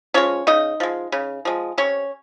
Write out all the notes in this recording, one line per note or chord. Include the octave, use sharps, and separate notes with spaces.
F3 G#3 C#4 C#5
C#3 D#4 D#5
F3 G#3
C#3
F3 G#3
C3 C#4 C#5